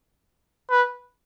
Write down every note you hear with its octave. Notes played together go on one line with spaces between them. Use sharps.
B4